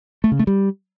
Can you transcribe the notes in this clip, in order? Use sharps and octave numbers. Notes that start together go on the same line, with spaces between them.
A3
C#3
A3
G3